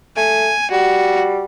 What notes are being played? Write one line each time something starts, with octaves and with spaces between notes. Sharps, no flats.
A3 G#5
G3 F#4